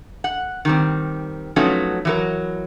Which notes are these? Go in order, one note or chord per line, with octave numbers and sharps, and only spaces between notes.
F#5
D#3 G3 C4
F3 F#3 A3 B3 C#4 D#4
E3 F#3 A#4